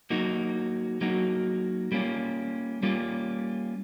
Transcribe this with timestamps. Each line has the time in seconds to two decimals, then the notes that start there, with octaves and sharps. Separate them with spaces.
0.10 F#3 A#3 D#4 F#4
1.01 F#3 A#3 D#4 F#4
1.92 G3 A#3 C#4 F4
2.83 G3 A#3 C#4 F4